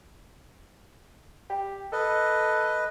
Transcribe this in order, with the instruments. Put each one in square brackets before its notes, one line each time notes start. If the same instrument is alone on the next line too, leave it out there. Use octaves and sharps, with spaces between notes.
[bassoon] G4
[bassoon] A4 [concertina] B4 D#5